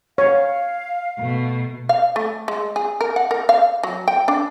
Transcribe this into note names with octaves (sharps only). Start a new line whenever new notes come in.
C#5 F5
B2 A3
F5
A3
G#3
G#4
A#4
F#5
A#4
F5
F#3
G5
D4